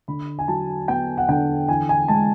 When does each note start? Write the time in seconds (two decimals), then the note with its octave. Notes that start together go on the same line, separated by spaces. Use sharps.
0.08 D3 B5
0.39 G#5
0.48 F#3 A5
0.88 B3 G5
1.17 F#5
1.29 D3 G5
1.68 E3 G#5
1.89 G#5
2.08 G#3 A5